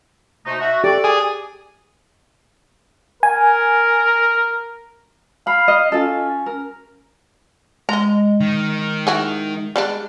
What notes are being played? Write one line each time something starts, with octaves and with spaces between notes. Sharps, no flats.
B2 A3 D#4 C5
F#4 E5
G4 A4 D5
G#4
A#4 G#5
F5 B5
D#5
C#4 F4 A4
A#4
G#3 D#5 A#5
D#3
E4 F#4 G#4
G3 G#3 D4